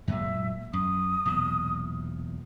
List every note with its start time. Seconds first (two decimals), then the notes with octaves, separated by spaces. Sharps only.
0.07 F#2 A#2 G#3 E5
0.73 F#2 D#6
1.25 B1 E2 A#2